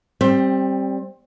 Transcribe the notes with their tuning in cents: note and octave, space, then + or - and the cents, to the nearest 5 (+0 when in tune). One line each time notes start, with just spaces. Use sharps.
G3 +0 C4 +20